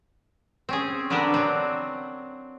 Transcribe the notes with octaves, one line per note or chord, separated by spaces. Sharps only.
C4 C#4 G#4
D3 G3 B3 D4 G4 A#4
F#3 C4